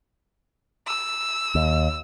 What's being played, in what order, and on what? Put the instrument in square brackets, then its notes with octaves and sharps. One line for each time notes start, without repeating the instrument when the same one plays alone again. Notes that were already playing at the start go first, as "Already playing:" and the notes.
[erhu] E6
[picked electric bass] D#2